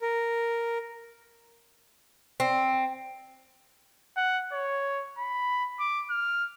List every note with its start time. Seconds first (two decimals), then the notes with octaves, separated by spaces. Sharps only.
0.02 A#4
2.40 C4
4.16 F#5
4.52 C#5
5.18 B5
5.80 D6
6.10 F6